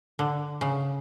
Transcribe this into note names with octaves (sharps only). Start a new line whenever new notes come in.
D3
C#3